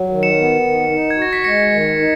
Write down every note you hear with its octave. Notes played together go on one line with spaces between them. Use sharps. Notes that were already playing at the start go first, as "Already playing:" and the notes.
Already playing: F#3
D#3
C#7 E7
B3
D#3
D#4
G#6
F#4 A#6
B6
G#3 A#6 C#7
D#3
D#4